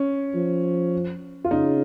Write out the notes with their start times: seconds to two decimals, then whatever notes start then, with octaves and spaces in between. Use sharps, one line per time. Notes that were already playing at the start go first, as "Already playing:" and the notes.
Already playing: C#4
0.35 F3
1.44 F4
1.51 C#3 D#4